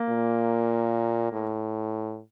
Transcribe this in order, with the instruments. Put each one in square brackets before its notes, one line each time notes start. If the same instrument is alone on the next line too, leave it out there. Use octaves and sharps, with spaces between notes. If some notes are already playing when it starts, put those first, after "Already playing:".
Already playing: [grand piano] A#3
[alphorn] A#2
A2